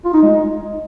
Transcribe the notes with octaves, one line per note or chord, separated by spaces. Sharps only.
F4
D#4
G#3